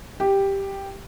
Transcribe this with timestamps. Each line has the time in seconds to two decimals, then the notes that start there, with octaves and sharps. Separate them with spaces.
0.20 G4